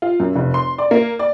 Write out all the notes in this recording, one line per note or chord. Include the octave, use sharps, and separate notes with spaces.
F4
F#2
F1
C6
D5
A#3
D5